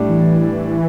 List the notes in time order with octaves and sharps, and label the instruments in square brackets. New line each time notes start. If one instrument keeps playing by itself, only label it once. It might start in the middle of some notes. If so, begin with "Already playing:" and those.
Already playing: [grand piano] A2 G3 D4
[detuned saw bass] E3